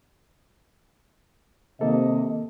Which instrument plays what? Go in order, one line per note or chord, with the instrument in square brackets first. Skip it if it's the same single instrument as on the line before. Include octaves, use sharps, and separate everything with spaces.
[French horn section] C3 D#5 [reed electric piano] D#3 A#3 A4